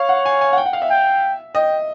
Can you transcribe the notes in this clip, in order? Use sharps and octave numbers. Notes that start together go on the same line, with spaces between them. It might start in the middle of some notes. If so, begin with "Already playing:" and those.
Already playing: C#5 F5
F#5
G#5
G#5
F#5
G5
F#5
F5
E5
G5
D#5 G5